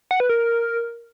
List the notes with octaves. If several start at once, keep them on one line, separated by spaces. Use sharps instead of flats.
F#5
B4
A#4